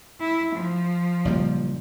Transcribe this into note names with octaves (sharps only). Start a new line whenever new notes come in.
E4
F3
F#1 A#2 G3